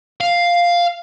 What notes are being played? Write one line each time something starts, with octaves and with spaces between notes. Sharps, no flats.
F5